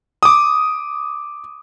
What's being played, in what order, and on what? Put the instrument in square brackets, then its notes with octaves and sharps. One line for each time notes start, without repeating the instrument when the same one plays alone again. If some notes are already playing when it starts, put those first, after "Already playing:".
[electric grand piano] D6 D#6